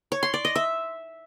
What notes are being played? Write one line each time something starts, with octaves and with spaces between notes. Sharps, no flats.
C#5
C6
D5
D#5
E5